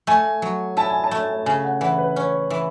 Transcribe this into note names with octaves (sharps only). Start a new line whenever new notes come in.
A3 G#5
F#3
E4 A5
G#5
A5
A3
C#3 G#5
F#5
E3 F#5
B4
C#4 C#5
E3